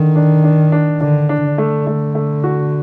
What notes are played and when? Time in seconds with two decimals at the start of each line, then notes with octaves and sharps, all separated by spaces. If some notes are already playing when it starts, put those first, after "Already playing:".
Already playing: D3 D#3
0.16 D4
0.44 D4
0.72 D4
1.01 D3 D4
1.29 D4
1.44 D3
1.58 A3
1.87 A3
2.15 A3
2.44 F#4